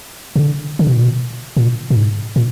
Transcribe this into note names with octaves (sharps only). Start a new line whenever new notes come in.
B2
D3
D3
B2
A#2
B2
A#2
A#2
G#2
A#2